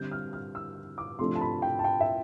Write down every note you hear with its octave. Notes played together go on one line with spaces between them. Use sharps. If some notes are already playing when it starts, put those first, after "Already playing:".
Already playing: D3 G3 C4 G6
F6
F6
E6
D6
C3 F3 A3 D4 C6
A5
B5
G5
A5
G5
E5